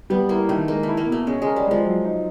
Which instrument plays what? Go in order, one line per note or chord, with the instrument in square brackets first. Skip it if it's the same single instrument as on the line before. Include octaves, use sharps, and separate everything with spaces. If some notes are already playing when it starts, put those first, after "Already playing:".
[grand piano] G3 [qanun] B3
[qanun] A#3 [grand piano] E4
[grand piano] D#3 [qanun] A3
[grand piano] G#3 [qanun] A#3
[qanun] A3
[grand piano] E4
[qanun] A#3
[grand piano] B2 [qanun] A3
[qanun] G#3 [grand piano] C#4
[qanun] G#3 [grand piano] A#4
[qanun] G3
[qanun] F3 [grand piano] G#3
[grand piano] F#3
D#4